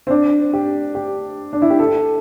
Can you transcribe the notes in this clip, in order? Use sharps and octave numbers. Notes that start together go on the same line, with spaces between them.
C4
D4
G4
G4
D4
E4
G4
A4